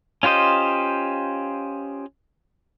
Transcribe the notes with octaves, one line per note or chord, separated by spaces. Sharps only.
C#4 F4 G4 C5 D#5